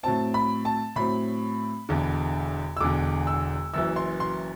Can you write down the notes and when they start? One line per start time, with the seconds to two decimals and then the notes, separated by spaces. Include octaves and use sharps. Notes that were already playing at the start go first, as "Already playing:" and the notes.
0.03 A2 F#3 C4 A5
0.34 B5
0.65 A5
0.96 A2 F#3 C4 B5
1.89 E1 E2 D3
2.77 E6
2.80 E1 E2 D3 D6
3.27 E6
3.74 F#1 F#2 E3 E6
3.96 C6
4.20 C6